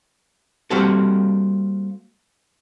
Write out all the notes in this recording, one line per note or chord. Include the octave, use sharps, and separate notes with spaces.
G3 A#3 C4 F#4 A4